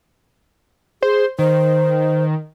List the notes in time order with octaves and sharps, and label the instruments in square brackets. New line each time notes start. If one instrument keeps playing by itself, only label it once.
[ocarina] G#4 [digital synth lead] C5
[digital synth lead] D#3 [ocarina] C5